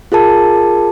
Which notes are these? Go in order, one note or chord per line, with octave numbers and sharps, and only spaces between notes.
F4 G#4 A#4 A5